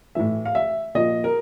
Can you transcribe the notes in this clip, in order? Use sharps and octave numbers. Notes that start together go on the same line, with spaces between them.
A2 E3 E5
F5
E5
A#2 F3 D#5
A#4